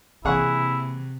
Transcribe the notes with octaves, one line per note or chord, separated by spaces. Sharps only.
C3 E3 A#3 E4 G#4 F#5 C#6